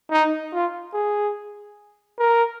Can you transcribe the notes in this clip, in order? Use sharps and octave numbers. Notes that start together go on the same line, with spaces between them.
D#4
F4
G#4
A#4